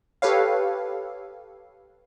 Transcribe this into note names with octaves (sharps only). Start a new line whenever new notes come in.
G4 A4 B4 C#5 F5